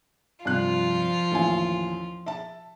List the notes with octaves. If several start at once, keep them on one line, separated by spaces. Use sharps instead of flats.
G2 C3 F3 F4 F#6
A1 D#2 G#5
E5 A5